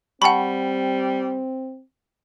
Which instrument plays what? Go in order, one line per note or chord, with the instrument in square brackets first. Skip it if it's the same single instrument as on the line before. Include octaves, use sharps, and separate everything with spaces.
[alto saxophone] G3 [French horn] C4 [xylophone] F#5 B5 [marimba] G5 A5 C#6